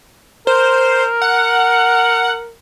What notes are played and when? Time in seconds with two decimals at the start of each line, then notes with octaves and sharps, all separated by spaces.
0.47 A#4 C5
1.22 F#5